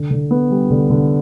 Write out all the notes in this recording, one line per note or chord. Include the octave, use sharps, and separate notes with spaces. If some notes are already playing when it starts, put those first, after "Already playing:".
Already playing: D3
D3
B3
G3
D3
D3